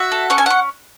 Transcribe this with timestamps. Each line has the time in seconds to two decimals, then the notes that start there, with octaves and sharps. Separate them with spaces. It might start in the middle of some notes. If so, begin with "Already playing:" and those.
Already playing: F#4 E5
0.12 A4
0.30 C#4 F#5
0.38 G#5
0.46 C#4 F#5